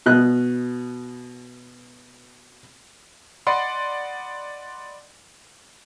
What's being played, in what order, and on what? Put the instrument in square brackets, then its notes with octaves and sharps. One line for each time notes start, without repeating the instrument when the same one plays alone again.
[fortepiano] B2 D#5 F#6
[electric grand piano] D5 D#5 F#5 B5 C6